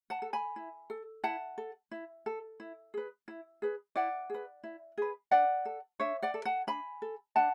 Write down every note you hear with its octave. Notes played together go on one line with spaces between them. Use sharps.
F#5 A5
A4
G#5 B5
E4
A4
E4 F#5 A5
A4
E4
A4
E4
G#4 B4
E4
G#4 B4
E4 D5 F#5
G#4 B4
E4
G#4 B4
D4 D5 F#5
A4
D4 C#5 E5
D5 F#5
A4
F#5 A5
D4 G#5 B5
A4
D4 F#5 A5